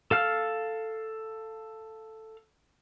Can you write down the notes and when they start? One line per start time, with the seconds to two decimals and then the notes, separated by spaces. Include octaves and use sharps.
0.11 A4 F5 F6